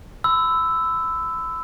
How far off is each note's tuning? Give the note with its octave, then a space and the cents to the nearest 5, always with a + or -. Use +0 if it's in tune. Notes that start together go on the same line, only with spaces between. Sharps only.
B5 +40 E6 +0